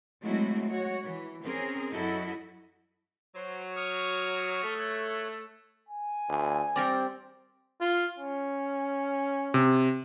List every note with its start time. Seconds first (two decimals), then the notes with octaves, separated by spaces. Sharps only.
0.22 F#3 G#3 A3 C4 E4 F#4
0.70 F#4 C#5
1.04 E3
1.43 C4 C#4 G#4 A#4
1.91 F#2 F#3 E4 F#4 A4 D#5
3.35 F#3 C5
3.76 C#6 D#6 F6
4.63 A3
4.78 C#5 F#6
5.89 G#5
6.29 D2
6.76 G3 C4 A#4 D5
7.81 F4
8.19 C#4
9.54 C3